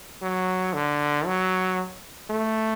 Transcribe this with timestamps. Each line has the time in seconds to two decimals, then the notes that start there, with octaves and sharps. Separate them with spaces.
0.22 F#3
0.74 D3
1.26 F#3
2.30 A3